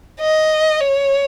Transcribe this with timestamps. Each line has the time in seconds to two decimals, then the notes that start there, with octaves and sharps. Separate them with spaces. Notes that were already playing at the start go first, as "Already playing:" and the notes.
0.21 D#5
0.80 C#5